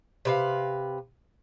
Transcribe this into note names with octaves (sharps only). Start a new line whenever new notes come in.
C3 B4 F5